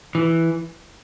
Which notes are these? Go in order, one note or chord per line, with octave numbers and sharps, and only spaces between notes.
E3